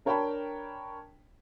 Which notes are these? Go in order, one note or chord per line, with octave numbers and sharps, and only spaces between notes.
D4 A#4 C#5 G5 A5 B5